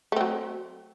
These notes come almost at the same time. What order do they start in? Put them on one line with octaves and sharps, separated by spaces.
A3 C4 F#3